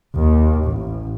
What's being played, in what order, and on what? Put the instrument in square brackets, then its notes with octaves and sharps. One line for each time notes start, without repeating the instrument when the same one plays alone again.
[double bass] D#2
A1